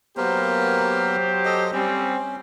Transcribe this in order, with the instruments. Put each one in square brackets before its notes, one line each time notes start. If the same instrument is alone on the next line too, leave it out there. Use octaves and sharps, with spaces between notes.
[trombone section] F#3 G4 C5 [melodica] A#3 B3 A#4
[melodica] A4 D#5
[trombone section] G3 C4 [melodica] C#4